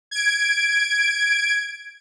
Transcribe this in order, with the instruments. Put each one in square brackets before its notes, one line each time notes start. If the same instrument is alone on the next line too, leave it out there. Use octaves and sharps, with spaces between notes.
[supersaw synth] G#6 D7